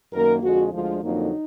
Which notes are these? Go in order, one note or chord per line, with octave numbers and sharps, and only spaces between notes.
F#2 D#3 A#3 A#4
F2 D3 G#3 F#4
D2 D3 F3 G#3 F4
F2 D3 F#3 A#3 D#4